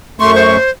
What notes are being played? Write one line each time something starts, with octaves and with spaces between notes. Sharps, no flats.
F#2 A3 C6 C#6
C5